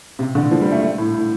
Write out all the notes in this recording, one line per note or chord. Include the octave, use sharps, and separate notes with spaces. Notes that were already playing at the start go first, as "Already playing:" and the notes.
C3
D3
F3
G3
A3
A3
A2
A2